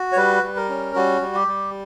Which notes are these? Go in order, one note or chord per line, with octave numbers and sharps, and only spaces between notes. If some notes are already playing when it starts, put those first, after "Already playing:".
Already playing: F#4
C#5
G3 B4
G3
A#4
C#4
G3 F#4
G3
G4
G3